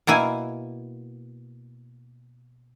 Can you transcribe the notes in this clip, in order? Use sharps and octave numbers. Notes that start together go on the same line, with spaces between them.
B2 A#3 E4 G#5